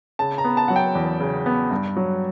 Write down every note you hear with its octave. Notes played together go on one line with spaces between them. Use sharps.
C#3 A5
A#5
B3
A5
F#3 F#5
G5
E2
C#3
B3
G2
F#3